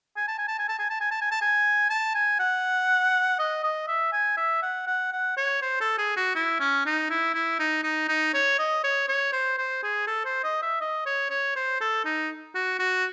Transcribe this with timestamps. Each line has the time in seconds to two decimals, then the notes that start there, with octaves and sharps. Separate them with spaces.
0.17 G#5
0.28 A5
0.38 G#5
0.48 A5
0.59 G#5
0.69 A5
0.79 G#5
0.90 A5
1.01 G#5
1.11 A5
1.21 G#5
1.31 A5
1.41 G#5
1.90 A5
2.15 G#5
2.40 F#5
3.39 D#5
3.63 D#5
3.88 E5
4.13 G#5
4.37 E5
4.63 F#5
4.87 F#5
5.13 F#5
5.37 C#5
5.62 C5
5.81 A4
5.98 G#4
6.17 F#4
6.35 E4
6.60 C#4
6.86 D#4
7.10 E4
7.34 E4
7.59 D#4
7.84 D#4
8.08 D#4
8.34 C#5
8.59 D#5
8.84 C#5
9.08 C#5
9.33 C5
9.58 C5
9.83 G#4
10.07 A4
10.25 C5
10.44 D#5
10.62 E5
10.81 D#5
11.06 C#5
11.30 C#5
11.56 C5
11.81 A4
12.05 D#4
12.55 F#4
12.79 F#4